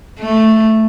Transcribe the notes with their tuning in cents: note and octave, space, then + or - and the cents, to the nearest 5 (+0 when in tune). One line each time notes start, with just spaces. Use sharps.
A3 +0